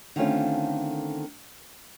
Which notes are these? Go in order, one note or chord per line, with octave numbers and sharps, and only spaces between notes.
D3 D#3 A3 C4 C#4 F4